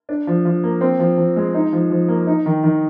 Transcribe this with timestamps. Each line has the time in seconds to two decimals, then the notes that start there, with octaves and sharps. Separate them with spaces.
0.09 D4
0.27 F3
0.45 F3
0.63 A#3
0.81 C4
0.99 F3
1.18 F3
1.36 G#3
1.54 D#4
1.73 F3
1.90 F3
2.08 A#3
2.27 D#4
2.46 D#3
2.64 D#3